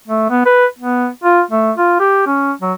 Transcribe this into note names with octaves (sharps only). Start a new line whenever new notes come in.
A3
B3
B4
B3
F4
A3
F4
G4
C#4
F#3